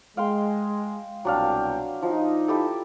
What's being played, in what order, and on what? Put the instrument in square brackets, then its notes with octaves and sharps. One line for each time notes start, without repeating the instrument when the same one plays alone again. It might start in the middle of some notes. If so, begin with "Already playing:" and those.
[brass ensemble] G#3 [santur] F5 G5 C6
[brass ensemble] C2 B2 G5 [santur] F#3 D4 F5
[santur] F3 [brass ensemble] D#4
[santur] E4 G4 A4